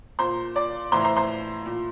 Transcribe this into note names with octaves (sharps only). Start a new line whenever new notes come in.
A#2 C5 C6
D5 D6
A2 E3 C5 C6
A#5
C5 C6
C5 C6
A#2